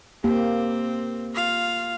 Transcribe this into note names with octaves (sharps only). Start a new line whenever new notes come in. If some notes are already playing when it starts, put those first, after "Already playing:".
A#3 C4 G4
F4 F5